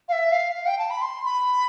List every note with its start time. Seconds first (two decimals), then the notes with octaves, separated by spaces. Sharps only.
0.08 F5
0.13 E5
0.31 F5
0.55 F5
0.67 G5
0.79 A5
0.90 B5
1.02 C6
1.25 B5